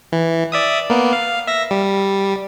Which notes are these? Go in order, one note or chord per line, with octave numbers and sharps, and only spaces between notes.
E3
D5 E5 D#6
A#3 B3
F5
E5 A#6
G3